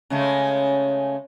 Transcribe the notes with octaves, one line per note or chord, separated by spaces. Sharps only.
C#3 G#3 A3